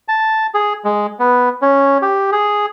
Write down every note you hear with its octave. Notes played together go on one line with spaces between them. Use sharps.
A5
G#4
G#3
B3
C#4
G4
G#4